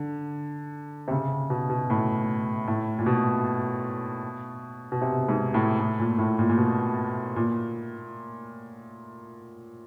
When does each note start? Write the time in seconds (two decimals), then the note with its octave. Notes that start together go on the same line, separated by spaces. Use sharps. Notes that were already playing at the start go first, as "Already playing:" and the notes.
Already playing: D3
1.08 C3
1.11 C#3
1.50 B2
1.70 B2
1.90 A2
2.68 A2
2.99 A#2
3.06 B2
4.92 B2
5.01 C3
5.28 G#2
5.54 A2
5.80 A2
5.99 A#2
6.19 A2
6.39 A#2
6.49 A#2
6.57 B2
7.36 A#2